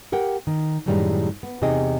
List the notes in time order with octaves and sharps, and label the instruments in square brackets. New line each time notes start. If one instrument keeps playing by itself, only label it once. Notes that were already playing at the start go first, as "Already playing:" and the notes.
[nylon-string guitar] G4 A#4 F#5 G5
D#3
F#2 A2 D#3 G3 G#3
B3
E2 C3 D#4 G#4 D#5 G5